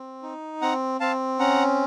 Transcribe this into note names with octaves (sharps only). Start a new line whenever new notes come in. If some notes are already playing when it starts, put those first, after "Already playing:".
Already playing: C4
D#4
C4 F#5 A#5
C4 F5 A5
C#4 F#5 A#5